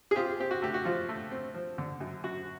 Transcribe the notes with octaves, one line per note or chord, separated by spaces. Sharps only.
G#4
C4 F4 G4
C4 G4
F#4
A3 G4
F#4
F3 F4
A3
C4
F3
D3
F#2
F#2 F#4